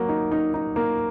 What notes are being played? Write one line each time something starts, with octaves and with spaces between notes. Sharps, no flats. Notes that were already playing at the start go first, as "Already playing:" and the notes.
Already playing: F#3 A#3 F#4
D#4
D#4
D#4
A#3